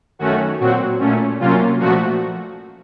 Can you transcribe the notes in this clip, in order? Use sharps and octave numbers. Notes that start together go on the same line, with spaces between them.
F#2 D#3 A3 C#4 F#4
A#2 F#3 C4 F#4
A#2 A3 C#4
C3 F#3 A#3 C#4 F4
A#2 F3 A3 F#4